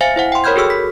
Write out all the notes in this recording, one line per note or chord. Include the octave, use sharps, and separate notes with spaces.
C5 E5 F5 G#5 A6 C#7
E4 C5 F#5
G5 C6
A#4 C#5 B5 F6 G6 G#6
F#4 G#4 A4 E6 F6
B6